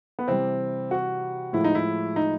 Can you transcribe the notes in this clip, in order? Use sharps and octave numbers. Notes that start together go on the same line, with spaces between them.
B3
C3 E3 G3 C4
F#4
A2 F3 G#3 E4
D#4
E4
D#4